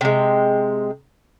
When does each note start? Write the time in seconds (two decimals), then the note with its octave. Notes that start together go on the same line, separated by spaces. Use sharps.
0.01 C3 G#3